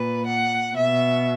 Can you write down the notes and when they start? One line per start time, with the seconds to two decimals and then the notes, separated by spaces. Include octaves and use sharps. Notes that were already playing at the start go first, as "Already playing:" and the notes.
Already playing: A#2 B4
0.26 F#5
0.76 B2 E5